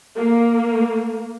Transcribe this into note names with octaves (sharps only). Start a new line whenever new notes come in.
A#3